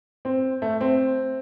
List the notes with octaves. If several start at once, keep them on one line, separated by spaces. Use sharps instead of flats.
C4
A3
C4